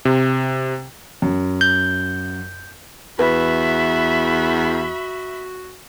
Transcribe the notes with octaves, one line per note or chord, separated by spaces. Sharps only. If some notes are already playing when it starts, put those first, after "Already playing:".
C3
F#2
G6
E2 F#4 B4 E5 B5